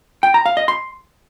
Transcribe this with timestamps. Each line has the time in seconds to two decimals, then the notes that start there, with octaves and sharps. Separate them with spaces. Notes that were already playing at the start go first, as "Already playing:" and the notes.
0.23 G5
0.34 A#5
0.46 F5
0.57 D#5
0.68 C6